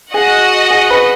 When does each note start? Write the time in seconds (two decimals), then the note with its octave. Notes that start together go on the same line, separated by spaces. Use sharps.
0.14 F#4 G#4 D#5 F#5
0.71 G#4
0.90 B4